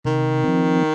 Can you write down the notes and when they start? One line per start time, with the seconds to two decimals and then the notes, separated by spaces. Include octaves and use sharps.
0.05 C3 D#3
0.44 F3 C4